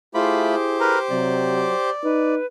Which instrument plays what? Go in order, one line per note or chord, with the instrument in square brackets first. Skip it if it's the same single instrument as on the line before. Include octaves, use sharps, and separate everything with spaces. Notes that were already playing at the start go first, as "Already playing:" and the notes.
[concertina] A3 F4 B5 [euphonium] E4 [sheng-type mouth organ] G4 C5 D6 [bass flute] G#4
[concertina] A#4 B4 A#5
[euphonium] C3 [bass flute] F#3 [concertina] D5
[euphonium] D#4 [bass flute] B4